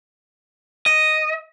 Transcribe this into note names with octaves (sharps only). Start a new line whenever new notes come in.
D#5